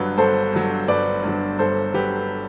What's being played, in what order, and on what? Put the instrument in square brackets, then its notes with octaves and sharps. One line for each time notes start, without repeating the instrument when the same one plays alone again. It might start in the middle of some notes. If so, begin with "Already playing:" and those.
Already playing: [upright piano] G1 G2 F#3 B4
G1 A4 C5
G2 F#3
G1 B4 D5
G2 F#3
G1 A4 C5
F#3 G4 B4